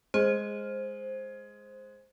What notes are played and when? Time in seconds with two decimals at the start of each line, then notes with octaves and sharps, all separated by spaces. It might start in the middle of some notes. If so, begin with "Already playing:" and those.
0.14 G#3 C5